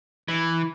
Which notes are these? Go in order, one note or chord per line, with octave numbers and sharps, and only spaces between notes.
E3